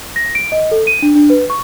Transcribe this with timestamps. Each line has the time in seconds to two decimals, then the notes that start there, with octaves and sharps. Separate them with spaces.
0.16 A#6
0.35 D7
0.52 D#5
0.71 A4
0.87 D#7
1.02 D4
1.15 D4
1.30 B4
1.50 C#6